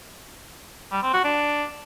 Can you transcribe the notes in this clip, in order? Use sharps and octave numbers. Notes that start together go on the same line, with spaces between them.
G3
C4
F#4
D4